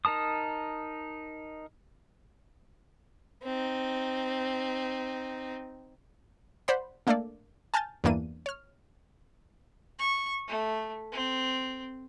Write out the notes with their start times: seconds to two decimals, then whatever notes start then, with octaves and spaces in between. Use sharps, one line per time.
0.05 D#4 A#4 A5 D#6
3.43 C4 D#4
6.68 C5 D5 F#5 B5
7.07 A3 A#3 D4 A4 D5
7.74 G#5 A5 F6 G6 A6
8.04 E2 G2 E3 A#3 D4 D#7
8.46 C#5 F6
9.99 C#6
10.48 A3
11.12 C4